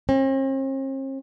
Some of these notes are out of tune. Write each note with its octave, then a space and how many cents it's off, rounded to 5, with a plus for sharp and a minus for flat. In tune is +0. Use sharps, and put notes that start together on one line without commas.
C4 +45